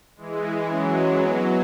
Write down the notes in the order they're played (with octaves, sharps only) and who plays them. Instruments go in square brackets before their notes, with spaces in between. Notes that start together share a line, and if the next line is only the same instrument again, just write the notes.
[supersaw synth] E3 G#3
[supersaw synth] F#3 [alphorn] C#4
[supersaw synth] F#3 [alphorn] B3